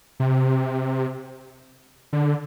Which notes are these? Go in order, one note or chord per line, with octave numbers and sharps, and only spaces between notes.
C3
D3